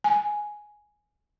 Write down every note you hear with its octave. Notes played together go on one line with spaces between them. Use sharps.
G#5